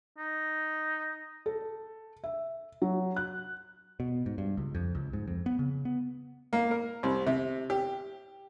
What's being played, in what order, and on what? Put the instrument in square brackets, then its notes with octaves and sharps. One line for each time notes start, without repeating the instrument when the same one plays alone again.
[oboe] D#4
[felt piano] A4
E5
F#3
F#6
[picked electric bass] B2
G#2
G2
C#2
F2
C#2
G#2
F2
B3
C#3
B3
[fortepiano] A#3
A#4
C2
C3
G4